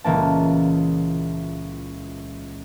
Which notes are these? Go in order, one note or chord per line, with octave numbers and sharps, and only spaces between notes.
C#2 A#2 E3 A#3 A5